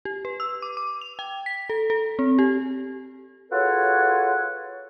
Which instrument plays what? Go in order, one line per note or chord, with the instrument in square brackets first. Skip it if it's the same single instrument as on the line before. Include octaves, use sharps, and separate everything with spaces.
[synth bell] G4
B4
E6
D6
D6
F7
G5
B6
A4
A4
C4
G4
[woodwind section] F4 F#4 G#4 A4 B4 C#5